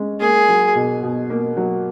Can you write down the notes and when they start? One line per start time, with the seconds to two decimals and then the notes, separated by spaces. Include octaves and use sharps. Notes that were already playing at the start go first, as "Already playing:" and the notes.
Already playing: G#3 C#4
0.20 A#3 G#4
0.48 F#3
0.75 B2
1.03 B2
1.30 A#3
1.57 F#3